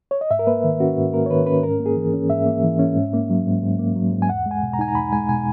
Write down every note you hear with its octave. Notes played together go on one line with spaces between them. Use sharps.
C#5
D#5
G#2 E5
A#4
A#3 B4
D#3
C#4 F#4
G#2
A#3 A#4
C#5
D#3 B4
C#4 B4
G#2 A#4
A#3
G#4
E3
C#4
G#2 E5
A#3
E3
C#4
G#2
A#3
F#3
G#2
G#2
A#3
F#3
G#2
G#5
E2 F#5
G#3
G#5
B2
A#5
D#4 G#5
A#5
E2 B5
G#3 G#5
B2 G#5